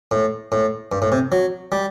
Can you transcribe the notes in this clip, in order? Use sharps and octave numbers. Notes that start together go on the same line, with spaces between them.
A2
A2
G2
A2
C3
F#3
G3